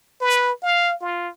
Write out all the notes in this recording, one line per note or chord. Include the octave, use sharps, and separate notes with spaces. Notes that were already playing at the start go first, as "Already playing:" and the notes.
B4
F5
F4